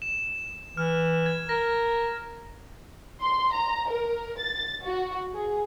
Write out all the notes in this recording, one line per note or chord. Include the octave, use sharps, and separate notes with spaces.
E7
E3 F6
G#6
A#4 A#6
C6
A#5
A#4
A6
F#4
G#4